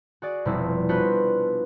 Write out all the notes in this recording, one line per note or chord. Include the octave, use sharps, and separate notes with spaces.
F#4 G#4 D5
F1 B2 F3 G3 C4 E4
B3 D4 F4 F#4 B4 C5